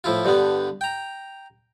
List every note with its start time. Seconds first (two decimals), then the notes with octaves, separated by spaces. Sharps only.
0.04 A2 F3 E4 F4
0.25 G2 D3 G3 B3
0.81 G5 A#5